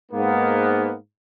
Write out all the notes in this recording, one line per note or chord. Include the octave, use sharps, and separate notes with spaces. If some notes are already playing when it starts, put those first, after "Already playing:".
G#2 A#3 B3